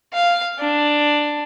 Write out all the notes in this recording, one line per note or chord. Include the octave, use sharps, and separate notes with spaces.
F5
D4